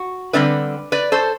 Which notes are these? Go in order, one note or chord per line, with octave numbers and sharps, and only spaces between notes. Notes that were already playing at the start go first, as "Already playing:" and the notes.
Already playing: F#4
D3 G3 C4 E4 B4 D5
B4 D5
A4 C5